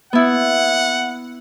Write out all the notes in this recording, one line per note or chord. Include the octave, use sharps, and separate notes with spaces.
B3 E4 F#5